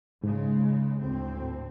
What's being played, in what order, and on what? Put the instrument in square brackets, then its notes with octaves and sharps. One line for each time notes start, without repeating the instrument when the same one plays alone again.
[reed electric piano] G#2 [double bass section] C#3 G#3
[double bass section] D2 A2 C4